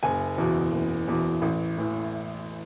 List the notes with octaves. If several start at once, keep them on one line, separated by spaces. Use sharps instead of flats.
F#1 G#5
E2 B2
F#1
E2 B2
A1
A2 E3